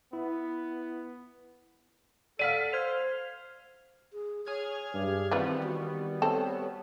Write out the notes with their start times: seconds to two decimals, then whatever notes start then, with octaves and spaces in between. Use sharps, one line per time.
0.13 B3 E4
2.39 A4 D5 F5 F#5 F6 B6 D#7
2.73 C5 F6 G#6 F7
4.13 G#4
4.46 G#4 C#5 F6 G#6
4.94 G2 G4
5.31 D#3 E3 G3 B3 C4 F4 B4
5.63 F#4
6.22 C4 A4 C#5